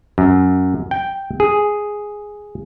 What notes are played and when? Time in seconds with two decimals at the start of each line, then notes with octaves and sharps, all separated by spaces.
0.18 F#2
0.91 G5
1.40 G#4